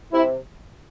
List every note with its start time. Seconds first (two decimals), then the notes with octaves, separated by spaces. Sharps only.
0.12 C3 E4